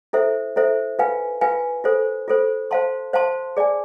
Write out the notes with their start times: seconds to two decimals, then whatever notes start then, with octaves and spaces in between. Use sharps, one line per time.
0.13 E4 A4 C5 E5
0.56 E4 A4 C5 E5
0.99 F4 B4 F5 G#5
1.41 F4 B4 F5 G#5
1.84 F4 A4 C5
2.28 F4 A4 C5
2.71 C5 F5 A5 C6
3.13 C5 F5 A5 C6
3.57 G#4 D5 G#5